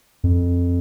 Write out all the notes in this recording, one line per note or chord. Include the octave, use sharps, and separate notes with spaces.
F2